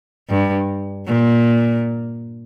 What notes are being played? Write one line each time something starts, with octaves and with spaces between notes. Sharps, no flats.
G2
A#2